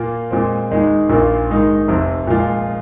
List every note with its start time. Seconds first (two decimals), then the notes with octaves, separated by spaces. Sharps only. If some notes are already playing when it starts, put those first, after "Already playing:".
Already playing: A#2 A#3 F4
0.31 A#2 G#3 C4
0.71 D#2 D#3 G#3 D#4
1.10 A#1 A#2 A#3 F4
1.50 G#2 D#3 G#3 D#4
1.88 F1 F2 C3
2.27 A#2 F3 G#3 F4